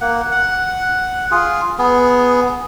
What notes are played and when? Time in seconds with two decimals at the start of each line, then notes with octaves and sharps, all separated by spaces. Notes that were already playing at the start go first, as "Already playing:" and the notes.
0.01 A#3 F#5
0.31 F#5
1.31 F4 G#4
1.78 B3 G#4